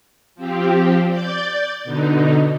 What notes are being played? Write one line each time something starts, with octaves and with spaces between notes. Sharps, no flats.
F3 C4 G4
D5 G6 A6
B2 D3 D#4